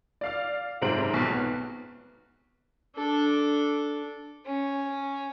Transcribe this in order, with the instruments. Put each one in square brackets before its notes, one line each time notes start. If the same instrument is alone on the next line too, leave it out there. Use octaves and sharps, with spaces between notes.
[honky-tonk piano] D5 F5 F6
F#1 G#2 C3 C5 D7 F#7
B1
B3
[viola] D4 A4
[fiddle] C#4